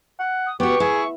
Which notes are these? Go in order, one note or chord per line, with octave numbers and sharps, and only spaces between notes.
F#5
D#6
B3 F#4 G4 C#6
E4 G#4